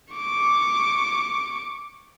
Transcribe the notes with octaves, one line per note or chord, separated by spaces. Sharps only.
C#6 D6